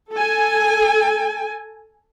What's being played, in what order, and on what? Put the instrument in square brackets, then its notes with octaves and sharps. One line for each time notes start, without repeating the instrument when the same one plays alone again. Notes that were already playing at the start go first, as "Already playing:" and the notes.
[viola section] A4 G#5